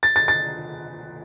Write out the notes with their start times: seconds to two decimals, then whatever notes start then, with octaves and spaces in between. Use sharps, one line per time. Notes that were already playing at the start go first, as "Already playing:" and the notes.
0.03 A6
0.16 A6
0.28 A6